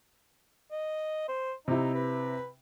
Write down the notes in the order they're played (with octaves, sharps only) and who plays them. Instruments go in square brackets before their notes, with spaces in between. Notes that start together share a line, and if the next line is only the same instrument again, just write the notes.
[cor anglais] D#5
C5
[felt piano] C3 E4 [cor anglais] D#4
[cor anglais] B4